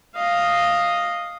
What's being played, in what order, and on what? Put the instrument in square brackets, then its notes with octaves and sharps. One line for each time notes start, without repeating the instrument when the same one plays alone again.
[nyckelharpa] D#5 F5